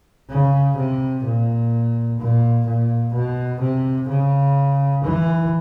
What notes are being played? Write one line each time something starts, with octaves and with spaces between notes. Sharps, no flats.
C#3
C3
A#2
A#2
A#2
B2
C3
C#3
E3